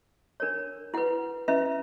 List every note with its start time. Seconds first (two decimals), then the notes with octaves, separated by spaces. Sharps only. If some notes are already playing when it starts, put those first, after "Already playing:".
0.40 D4 A#4 C#5
0.94 E4 B4 F#5
1.48 C#4 E4 B4 E5